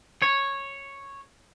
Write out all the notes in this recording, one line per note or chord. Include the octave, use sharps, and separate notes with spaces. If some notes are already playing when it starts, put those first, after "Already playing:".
C#5